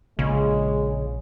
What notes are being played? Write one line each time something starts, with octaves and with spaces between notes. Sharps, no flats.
A#1 C#3 G#3